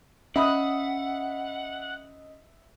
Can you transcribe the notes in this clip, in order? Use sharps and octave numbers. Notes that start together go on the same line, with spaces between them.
C#4 D#5 E5 F#5 B5 D#6